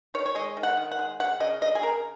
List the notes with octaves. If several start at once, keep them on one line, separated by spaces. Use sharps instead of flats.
D#3 C#5
C#5
G#3 D#5
D#3
F#5
D#3
F#5
G#3
C#3 F#5
C#3 D#5
C#3 D#5
G#4
C#3 A#4